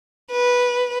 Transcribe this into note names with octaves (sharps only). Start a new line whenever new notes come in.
B4